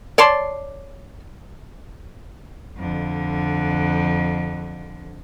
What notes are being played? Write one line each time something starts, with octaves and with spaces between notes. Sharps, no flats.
C#5 D5 A5 C6
F2 D3